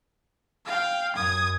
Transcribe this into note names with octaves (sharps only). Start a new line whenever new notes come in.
F5 G5
F#2 D#6 G#6